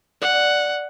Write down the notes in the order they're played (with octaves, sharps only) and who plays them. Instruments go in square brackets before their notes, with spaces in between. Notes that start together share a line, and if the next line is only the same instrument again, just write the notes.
[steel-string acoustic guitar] D5 [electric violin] F#5